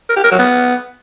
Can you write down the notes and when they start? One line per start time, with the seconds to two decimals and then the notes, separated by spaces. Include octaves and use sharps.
0.09 A#4
0.17 G4
0.24 A#4
0.32 F#3
0.39 B3